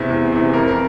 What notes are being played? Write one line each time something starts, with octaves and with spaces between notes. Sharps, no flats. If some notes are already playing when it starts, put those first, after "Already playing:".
Already playing: E2 C3 E3
E2
C3 E3
F2 A#4
A#4